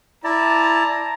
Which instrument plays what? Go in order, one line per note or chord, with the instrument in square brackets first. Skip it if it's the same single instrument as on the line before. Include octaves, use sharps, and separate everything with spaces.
[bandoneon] E4 D5 [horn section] A5 A#5